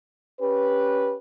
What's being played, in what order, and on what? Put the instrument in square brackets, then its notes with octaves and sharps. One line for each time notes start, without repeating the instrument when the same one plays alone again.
[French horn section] C#4 G4 B4